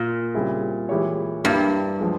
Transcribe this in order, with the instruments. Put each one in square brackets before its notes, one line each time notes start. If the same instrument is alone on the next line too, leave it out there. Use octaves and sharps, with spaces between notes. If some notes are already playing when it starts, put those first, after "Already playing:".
Already playing: [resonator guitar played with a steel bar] A#2 [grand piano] A#3 F4
[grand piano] C#3 G3 C4 E4 G#4
E3 G#3 E4 G4 C#5
[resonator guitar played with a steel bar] G2 [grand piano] G3 A#3 E4
[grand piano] F3 G#3